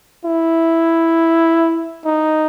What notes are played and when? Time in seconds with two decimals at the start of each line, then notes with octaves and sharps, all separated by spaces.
0.25 E4
2.05 D#4